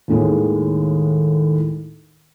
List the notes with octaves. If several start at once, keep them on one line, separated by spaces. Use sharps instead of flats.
D#2 A2 D#3 G#3